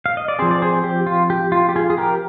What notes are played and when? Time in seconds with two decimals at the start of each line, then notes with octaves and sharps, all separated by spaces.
0.06 F5
0.17 D#5
0.28 D5
0.39 F3 C4 G#4 C5
0.51 D5
0.62 G#4 C5
0.84 G4
1.06 F4
1.30 G4
1.52 F4
1.69 G4
1.76 F4 G#4
1.90 G#4
1.97 G4 A#4